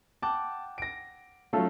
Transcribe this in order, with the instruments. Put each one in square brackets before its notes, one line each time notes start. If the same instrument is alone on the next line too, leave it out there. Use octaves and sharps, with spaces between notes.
[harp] F#5 G5 D6 [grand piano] A5
[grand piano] A#6 D7
[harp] F#3 C#4 [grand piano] A3 F4 A4